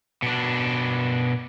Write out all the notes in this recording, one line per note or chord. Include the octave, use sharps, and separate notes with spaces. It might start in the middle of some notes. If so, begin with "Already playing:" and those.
B2 D4